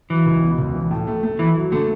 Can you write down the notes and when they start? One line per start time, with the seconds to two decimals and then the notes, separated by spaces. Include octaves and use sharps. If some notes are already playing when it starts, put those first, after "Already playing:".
0.10 E3 F#3
0.26 C#2
0.42 B2
0.58 C#2
0.75 E3
0.91 A2
1.07 A3
1.23 A3
1.39 E3 E4
1.56 F#3
1.72 D3 A3